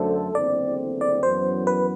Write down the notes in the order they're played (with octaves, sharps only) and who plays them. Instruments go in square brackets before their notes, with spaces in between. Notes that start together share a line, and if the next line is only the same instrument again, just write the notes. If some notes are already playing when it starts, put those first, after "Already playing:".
Already playing: [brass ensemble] F#2 D3 A3 D4 A4 [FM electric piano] C5
[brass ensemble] F#1 E2 D3 A3 C4 [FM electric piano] D5
[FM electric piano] D5
[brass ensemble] F#2 E3 B3 [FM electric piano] C5
[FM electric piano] B4